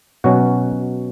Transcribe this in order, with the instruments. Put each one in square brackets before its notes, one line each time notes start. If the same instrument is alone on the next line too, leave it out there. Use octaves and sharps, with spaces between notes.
[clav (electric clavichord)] B2 F#3 C#4 F#4 F#5